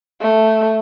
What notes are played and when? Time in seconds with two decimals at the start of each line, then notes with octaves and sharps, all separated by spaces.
0.21 A3